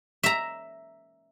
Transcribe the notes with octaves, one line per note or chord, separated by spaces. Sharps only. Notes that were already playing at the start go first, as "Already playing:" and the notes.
E5 A#5